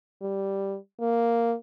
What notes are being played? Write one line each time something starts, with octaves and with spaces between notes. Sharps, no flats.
G3
A#3